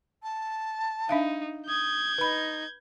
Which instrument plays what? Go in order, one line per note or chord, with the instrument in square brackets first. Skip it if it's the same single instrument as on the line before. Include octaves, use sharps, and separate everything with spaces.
[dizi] A5
[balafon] D4 E5 F5 [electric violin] D#4
[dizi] D#6 [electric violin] G6 G#6
[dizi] D#4 [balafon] B4 B5